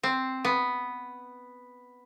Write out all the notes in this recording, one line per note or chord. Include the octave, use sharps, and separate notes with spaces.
C4
B3